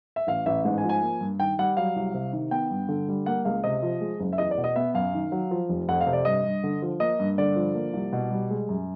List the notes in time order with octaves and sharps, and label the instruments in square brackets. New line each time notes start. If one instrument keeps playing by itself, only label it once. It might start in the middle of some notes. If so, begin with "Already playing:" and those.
[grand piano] E5
A1 F5
A1 E5
G#2
G#5
F3
G#5
A#3
G2
D#3 G5
G3 F#5
F#3 F5
C2
C3
D#3
B3 G5
G2
D3
G3
A#3 F#5
C#2 F5
C3 D#5
F3
G#3
F#1
E5
E2 D#5
D5
B2
D#5
B3 E5
F#2 F5
D#3
F#3
F3
F1
F2 F#5
F5
C3
D5
G2 D#5
G2
D3
F3
A#3 D#5
G2
D3 D5
F3
A#3
C2
B2
G3
G#3
F#2